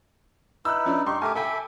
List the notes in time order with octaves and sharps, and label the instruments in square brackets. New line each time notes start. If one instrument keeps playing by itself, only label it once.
[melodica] D#4 E4 B4 [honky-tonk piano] E6 F#6
[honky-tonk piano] F3 C#4 D4
[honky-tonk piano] G2 C6 C#6 [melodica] D#4 G4
[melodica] A3 G4 A#4 [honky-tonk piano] G#5 D6
[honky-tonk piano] A4 G5 G#5 [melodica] E5 B5